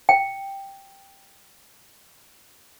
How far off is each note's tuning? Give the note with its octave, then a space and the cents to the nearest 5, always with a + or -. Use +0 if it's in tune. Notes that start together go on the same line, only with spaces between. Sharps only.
G5 +0